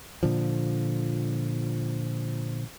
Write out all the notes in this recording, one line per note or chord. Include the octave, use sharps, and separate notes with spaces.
A#2 D3 F3